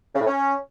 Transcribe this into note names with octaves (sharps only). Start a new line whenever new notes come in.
C#3
A2
C#4